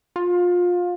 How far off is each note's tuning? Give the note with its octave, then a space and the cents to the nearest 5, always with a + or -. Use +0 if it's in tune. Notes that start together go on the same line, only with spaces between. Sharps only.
F4 +25